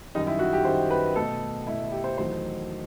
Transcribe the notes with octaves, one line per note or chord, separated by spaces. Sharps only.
F#2 D#3 G3 D#4
E4
F#4
G4
F#2 D#3 G3 C5
B4
B2 A3 A4
B2 A3 E4
G4
C5
E2 D#3 F#3 A3 C5